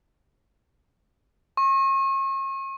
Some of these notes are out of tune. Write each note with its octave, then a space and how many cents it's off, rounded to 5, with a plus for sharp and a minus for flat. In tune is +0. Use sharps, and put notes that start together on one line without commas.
C#6 -40